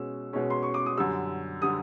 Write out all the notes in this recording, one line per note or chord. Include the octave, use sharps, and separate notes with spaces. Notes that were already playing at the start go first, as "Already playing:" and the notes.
Already playing: B2 G#3 C#4 E6
B2 G#3 C#4
C6
C#6
D6
D#6
F#2 D3 G3 E6
D3 G3 D#6